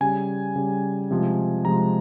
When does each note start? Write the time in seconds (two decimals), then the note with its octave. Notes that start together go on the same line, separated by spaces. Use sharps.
0.01 C#3 G3 G#5
0.56 C#3 G3
1.11 C3 F3 G#3
1.65 C3 F3 G#3 A#5